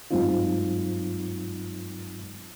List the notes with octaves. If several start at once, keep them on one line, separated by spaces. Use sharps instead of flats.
G2 F#3 G#3 C4 D#4 F4